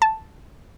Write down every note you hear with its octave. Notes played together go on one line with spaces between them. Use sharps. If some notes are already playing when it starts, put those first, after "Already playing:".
A5